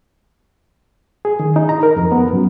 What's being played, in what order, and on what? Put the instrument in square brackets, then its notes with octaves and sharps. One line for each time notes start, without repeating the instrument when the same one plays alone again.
[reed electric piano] G#4
D#3
D#4
A#5
A#4
F2
B3
F#2